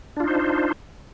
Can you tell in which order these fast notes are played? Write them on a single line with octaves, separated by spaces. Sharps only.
D4 F4 D#4 C5